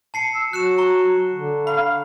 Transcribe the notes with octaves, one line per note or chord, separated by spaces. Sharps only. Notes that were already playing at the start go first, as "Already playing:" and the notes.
A5 C7 C#7
E6
F#3 F#4 F#6 C#7 E7
A#5 C#6
D3
F5 B5